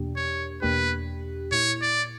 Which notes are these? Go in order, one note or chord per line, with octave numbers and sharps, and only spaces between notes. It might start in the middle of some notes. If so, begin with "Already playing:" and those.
Already playing: E2 B2 A#3 D4 G4
C#5
E2 B2 A#3 D4 G4 B4
A#2 A#3 E4 C#5
D5